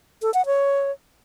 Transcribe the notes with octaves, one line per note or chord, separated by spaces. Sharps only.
A4
F#5
C#5